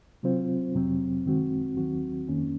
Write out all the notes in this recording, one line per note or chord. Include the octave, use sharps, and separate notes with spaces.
C3 F#3 C4 F4 C5
F2 C3 F#3 C4
F#2 D#3 G#3 C4 F#4
D#2 D#3 F#3 C4 F#4
F2 D#3 A#3 C#4